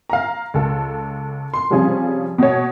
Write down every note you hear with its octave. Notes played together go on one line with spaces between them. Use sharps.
F5 A#5
C#2 A4
C6
C3 F3 G3 C#4 G#4
B2 C#5